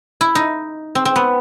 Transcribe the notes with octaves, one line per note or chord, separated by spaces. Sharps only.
E4
D#4
C4
C4
B3